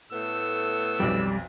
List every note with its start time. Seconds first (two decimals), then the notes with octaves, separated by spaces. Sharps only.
0.12 A2 A3 B3 E6
1.00 B1 F2 G3 D5